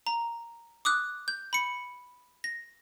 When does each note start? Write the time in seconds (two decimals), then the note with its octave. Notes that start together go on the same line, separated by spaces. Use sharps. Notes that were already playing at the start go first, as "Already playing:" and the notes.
0.07 A#5
0.85 D6 D#6 F#6
1.28 G6
1.53 B5 C#7
2.44 A#6